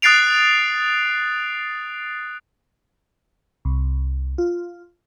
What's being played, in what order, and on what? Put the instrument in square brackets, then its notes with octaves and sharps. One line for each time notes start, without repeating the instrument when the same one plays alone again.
[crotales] D#6 F#6 A6 C7 D7 F7
[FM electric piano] C2
F4